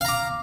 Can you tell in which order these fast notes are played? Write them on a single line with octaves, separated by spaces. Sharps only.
F5 A#5 D6